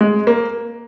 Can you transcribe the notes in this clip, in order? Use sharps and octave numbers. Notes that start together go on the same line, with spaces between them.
G#3
A#3